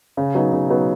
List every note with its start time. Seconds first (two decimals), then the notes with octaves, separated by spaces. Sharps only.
0.17 C#3
0.35 F#3 B3 D#4
0.52 C#3
0.69 F#3 B3 D#4